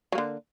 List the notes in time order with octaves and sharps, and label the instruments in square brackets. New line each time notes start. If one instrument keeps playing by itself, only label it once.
[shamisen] F#3
A#3
D3